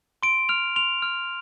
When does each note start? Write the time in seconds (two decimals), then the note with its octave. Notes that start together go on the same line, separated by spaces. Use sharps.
0.23 C6 D7
0.49 F6 F7
0.76 C6 F7
1.02 F6